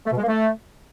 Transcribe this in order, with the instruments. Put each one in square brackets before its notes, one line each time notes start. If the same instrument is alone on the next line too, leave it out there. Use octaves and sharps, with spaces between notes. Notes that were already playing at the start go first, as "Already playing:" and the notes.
[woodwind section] A3
B2
G#3
A#3
A3